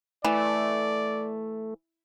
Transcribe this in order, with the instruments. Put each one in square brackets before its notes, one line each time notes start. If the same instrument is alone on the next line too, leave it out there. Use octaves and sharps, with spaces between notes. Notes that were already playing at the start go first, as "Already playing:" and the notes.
[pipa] E3 [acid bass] A3 [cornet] D5